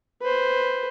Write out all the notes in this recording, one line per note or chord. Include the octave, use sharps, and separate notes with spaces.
B4 C5